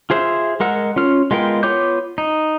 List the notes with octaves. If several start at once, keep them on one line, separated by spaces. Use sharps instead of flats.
F4 G#4 C5 E5
G#3 A#4 F#5 E6
C#4 F4 F6
G#3 B3 F4 A#4 G5
B3 F4 C#5 D6 G6
D#4